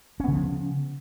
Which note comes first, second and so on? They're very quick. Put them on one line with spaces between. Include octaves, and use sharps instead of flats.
C#4 B3 C#3 F3